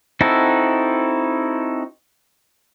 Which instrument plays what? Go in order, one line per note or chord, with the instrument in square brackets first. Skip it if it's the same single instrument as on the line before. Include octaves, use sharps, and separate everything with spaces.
[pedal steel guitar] C4 D#4 E4 F#4 A4